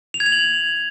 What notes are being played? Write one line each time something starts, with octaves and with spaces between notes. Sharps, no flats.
F7
G#6
F7
F#7